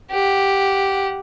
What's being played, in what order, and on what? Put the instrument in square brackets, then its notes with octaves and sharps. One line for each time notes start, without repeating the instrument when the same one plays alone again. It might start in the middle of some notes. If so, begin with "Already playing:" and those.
[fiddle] G4 F#5